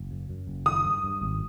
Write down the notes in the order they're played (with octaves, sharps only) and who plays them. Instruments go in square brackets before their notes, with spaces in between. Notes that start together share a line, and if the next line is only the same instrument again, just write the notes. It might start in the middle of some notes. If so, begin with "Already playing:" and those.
Already playing: [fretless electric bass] F#1
F#2
F#2
F#1
[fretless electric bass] D#3 [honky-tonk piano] D#6
[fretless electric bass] G2
G2
G#1